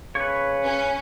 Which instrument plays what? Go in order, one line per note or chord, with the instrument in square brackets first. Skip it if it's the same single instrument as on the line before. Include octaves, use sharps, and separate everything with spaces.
[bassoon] C#3 [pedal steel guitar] B4 C#5
[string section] C#4